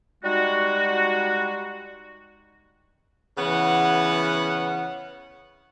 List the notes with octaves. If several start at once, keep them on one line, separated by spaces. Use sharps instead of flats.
G3 G#3 D#4 F#4
C#3 E3 B3 C#5 F#5